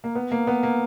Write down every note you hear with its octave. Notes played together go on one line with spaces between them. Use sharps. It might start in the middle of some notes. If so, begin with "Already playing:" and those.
A#3
B3
A#3
B3
A#3